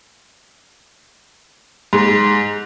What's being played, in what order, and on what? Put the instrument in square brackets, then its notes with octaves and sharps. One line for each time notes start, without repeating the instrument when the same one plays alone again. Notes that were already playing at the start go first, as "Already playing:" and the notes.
[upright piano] G#2